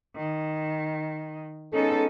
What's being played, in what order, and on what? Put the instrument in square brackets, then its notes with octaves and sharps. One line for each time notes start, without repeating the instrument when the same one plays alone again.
[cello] D#3
[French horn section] G#3 B3 A4 [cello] C#4 D#4